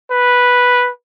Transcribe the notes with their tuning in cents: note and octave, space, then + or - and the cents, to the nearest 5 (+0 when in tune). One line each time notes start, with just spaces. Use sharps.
B4 -5